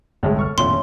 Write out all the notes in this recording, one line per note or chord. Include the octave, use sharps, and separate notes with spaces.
G1 C2 A2 G#3
A4 C#6 F6
D#1 F2 A2 F3 B3 C#4 C6